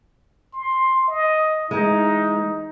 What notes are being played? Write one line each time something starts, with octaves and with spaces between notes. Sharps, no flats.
C6
D#5
E3 G#3 D#4